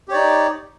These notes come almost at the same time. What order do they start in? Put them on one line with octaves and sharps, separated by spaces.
G4 C#5 D5 D#4